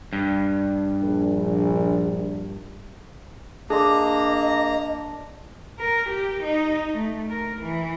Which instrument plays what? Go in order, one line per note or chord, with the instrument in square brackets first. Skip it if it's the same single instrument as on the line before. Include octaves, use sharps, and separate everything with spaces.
[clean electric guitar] G2
[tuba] A#1
[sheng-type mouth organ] A#3 A#5 [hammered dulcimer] D4 C6 [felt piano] G#4 [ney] D#5
[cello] A#4
G4
D#4
A3
A#4
E3